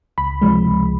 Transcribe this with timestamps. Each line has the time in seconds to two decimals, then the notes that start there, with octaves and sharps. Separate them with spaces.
0.18 C#2 B5
0.42 C3 F3 G#3
0.66 C#2